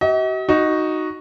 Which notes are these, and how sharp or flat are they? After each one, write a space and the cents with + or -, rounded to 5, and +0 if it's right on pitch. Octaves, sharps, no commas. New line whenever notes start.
F#4 +45 D#5 +40
D#4 +0 F#4 +0